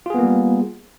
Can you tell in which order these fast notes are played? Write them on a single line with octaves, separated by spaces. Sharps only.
F4 G#4 B3 A#3 G3